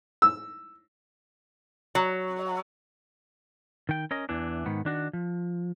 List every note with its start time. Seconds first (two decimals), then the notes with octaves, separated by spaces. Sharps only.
0.22 E6
1.95 F#3
3.89 D#3 G5
4.11 C#4 A#4 D#5
4.29 E2 E3 D4
4.66 G#2 D#3 B3
4.85 D#3 D4 F#4
5.13 F3